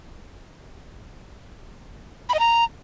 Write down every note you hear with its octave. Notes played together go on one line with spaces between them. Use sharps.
B5
D#5
A#5